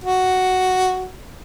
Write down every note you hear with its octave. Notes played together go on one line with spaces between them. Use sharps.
F#4